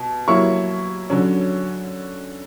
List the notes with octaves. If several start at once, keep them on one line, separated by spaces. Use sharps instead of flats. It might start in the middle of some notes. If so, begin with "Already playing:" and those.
Already playing: B2
F#3 A#3 E4 C#6
D3 F#3 C#4